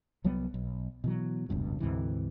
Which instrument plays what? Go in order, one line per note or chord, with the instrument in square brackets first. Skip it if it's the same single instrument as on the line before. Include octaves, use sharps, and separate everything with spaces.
[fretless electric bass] C2 F#3 G3 B3
B1
B2 E3 F#3
F1 C#2 G2 B2
D2 G#2 C3 E3